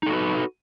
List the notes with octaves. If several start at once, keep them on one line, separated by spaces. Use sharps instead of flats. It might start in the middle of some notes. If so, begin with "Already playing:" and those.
D#4 F#4 A4 B4